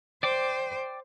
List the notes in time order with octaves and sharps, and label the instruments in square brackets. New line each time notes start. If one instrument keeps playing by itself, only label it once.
[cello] C5 [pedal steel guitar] D5 G5 D6